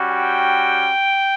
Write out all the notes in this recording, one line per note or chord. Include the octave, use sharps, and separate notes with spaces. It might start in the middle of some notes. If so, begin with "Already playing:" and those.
Already playing: G3 C#4 F#4
G5